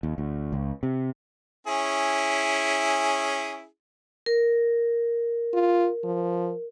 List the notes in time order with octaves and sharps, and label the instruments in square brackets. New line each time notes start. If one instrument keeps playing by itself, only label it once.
[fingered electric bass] D#2
D2
C#2
C3
[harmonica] C#4 E4 G#4
[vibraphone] A#4
[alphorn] F4
F3